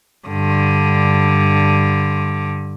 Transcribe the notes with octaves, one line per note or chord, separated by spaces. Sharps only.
G2 D3